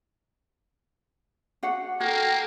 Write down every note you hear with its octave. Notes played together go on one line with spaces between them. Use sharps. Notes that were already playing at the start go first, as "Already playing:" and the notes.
D4 F#4 F#5
A#3 F#4 A4 G5